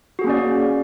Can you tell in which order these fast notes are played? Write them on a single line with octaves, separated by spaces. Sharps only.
F#4 G#4 A#3 C#4 D5